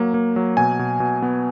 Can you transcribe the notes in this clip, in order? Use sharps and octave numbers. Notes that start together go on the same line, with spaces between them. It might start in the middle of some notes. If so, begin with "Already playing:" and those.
Already playing: F#3 A#3
A#3
F#3
B2 G#5
B2
B2
B3